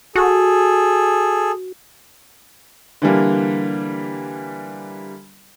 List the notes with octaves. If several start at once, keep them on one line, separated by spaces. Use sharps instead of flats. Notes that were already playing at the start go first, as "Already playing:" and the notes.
F#4 G#4 A4
D3 E3 G3 A#3